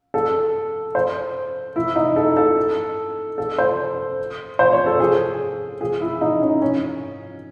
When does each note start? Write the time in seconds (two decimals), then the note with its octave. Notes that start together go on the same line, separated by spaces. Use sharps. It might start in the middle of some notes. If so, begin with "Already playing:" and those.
0.14 A4
0.95 C5
1.76 E4
1.96 D#4
2.16 A4
2.37 A4
3.38 A4
3.58 C5
4.59 C5
4.73 C#5
4.86 A4
5.00 G#4
5.81 G#4
6.01 E4
6.21 D#4
6.42 C#4
6.62 C#4